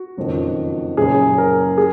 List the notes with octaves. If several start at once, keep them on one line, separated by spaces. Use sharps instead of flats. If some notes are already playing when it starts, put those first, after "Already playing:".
Already playing: F#4
F#1 F2 D#3
F#1 F#2 C#3 G#4
A#4
G#4